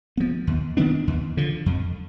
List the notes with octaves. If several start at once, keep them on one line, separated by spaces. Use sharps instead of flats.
F3 B3
D#2
D#3 B3 D4
D#2
D3 F3
F2